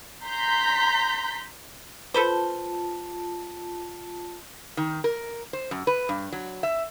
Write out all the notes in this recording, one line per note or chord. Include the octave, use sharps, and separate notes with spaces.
A#5 C6 G6 B6
F4 A4 B4 C5 A5
D#3
A#4
C5
F#2
B4
G2
F#3
E5